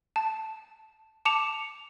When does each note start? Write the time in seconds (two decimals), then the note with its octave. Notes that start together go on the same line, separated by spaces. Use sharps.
0.16 A5
1.25 A5 D6 C#7 E7 F7